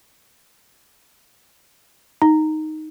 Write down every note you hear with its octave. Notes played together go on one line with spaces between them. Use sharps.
D#4